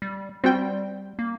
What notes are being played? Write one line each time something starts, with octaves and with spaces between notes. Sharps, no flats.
G3
G3 C4 F#4 G5
A#3